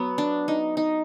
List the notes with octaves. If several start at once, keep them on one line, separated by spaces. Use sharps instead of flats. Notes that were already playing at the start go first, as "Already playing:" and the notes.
Already playing: F#3 B3
D4
D#4
D#4